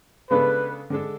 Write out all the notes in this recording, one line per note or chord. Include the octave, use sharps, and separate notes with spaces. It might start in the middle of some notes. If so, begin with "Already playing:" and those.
C#3 G#3 B3 D4 A4 B4
D3 G#3 D4 A4